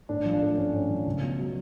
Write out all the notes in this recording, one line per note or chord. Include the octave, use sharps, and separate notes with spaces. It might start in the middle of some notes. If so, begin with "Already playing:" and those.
A2 D4
F3
D4
A3
A2 C#4
A2
F3
C#2
B2
F#3